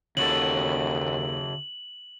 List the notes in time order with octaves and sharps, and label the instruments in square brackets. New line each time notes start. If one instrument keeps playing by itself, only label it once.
[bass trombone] D#2 [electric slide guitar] C#3 F#4 A4 [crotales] F#7